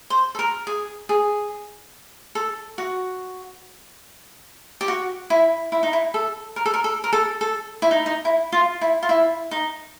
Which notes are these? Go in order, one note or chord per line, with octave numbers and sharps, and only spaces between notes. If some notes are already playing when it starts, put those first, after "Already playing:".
C5
A4
A#4
G#4
G#4
A4
F#4
G4
F#4
E4
E4
D#4
E4
A4
A#4
A4
A#4
A4
A#4
A4
A4
E4
D#4
D#4
E4
F4
E4
F4
E4
D#4